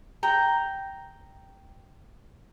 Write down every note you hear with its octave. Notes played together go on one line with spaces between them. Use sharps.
G5 A#5